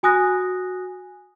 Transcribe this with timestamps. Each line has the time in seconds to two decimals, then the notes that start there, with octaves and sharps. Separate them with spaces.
0.03 F#4 G#5 D#6 F#6 A#6